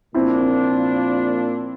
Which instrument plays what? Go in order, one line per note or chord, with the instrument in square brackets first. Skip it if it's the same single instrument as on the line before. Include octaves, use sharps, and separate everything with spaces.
[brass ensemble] A#2 F3 A#3 D4 [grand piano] C4 E4